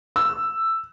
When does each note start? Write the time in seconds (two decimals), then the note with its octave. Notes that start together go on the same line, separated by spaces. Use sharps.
0.16 E6